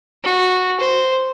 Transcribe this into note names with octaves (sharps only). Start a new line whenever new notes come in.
F#4
C5